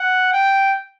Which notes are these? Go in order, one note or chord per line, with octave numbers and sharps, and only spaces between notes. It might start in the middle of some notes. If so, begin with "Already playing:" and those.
Already playing: F#5
G5